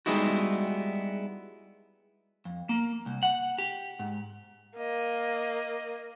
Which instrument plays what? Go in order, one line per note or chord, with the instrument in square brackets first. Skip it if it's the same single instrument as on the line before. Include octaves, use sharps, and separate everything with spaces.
[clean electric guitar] G3 G#3 B3 D#4 E4 F#4
F2
A#3
C2
F#5
G4
G#2
[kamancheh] A#3 D#5